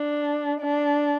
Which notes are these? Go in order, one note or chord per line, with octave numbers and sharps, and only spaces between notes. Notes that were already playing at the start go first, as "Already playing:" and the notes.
Already playing: D4
D4